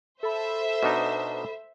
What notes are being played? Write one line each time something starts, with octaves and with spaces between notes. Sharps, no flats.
A4 C5 E5 B5
B2 D4 D#4